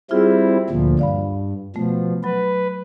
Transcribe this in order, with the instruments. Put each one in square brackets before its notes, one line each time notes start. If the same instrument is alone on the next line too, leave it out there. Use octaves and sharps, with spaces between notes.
[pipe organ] G3 C4 E4 [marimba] F4 G#4
[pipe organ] D2 A#2 F3
[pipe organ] G2 [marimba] D5 F5 B5
[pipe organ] B2 F3 [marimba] A3
[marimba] F#3 [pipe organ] B4